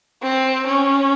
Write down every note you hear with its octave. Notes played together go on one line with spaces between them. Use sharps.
C4
C#4